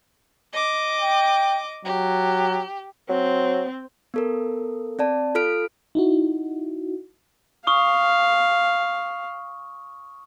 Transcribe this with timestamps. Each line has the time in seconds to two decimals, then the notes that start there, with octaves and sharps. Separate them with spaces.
0.53 D#5 D6
1.00 G5
1.85 F#3 G4
3.09 F#3 C4
4.14 B3 A4 A#4
4.99 C4 D5 A5
5.35 F4 A4 F6 D7
5.95 D#4 E4 F#4
7.67 F5 C#6 D#6 F6